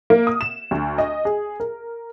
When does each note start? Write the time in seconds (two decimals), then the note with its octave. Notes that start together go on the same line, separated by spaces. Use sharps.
0.10 A#3
0.27 D#6
0.41 E7
0.71 D2
0.98 D#5
1.25 G#4
1.60 A#4